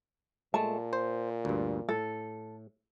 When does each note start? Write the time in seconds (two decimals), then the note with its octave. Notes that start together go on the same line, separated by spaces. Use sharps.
0.54 A#2 G#3 A3 A5
0.93 C5
1.45 D2 G2
1.89 A2 A4